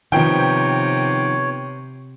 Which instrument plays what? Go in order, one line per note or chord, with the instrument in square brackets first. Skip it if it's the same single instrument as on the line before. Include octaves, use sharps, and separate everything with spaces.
[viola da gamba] C3 [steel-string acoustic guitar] D#3 F3 B3 [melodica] C#5 [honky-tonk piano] G5